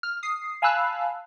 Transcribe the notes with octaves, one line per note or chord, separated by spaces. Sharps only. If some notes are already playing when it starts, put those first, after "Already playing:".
F6
D#6 C7
F5 G#5 A5 B5 E6 F#6